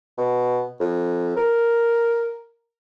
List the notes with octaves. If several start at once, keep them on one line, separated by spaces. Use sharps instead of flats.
B2
F2
A#4